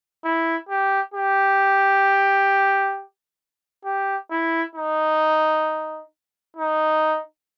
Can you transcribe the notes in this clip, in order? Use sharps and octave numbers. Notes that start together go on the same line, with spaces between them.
E4
G4
G4
G4
E4
D#4
D#4